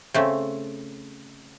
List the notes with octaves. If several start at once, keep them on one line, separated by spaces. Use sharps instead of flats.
C#3 A3 C4